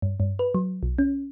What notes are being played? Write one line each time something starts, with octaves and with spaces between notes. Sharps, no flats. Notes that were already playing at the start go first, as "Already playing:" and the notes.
G2
G2
B4
F#3
B1
C#4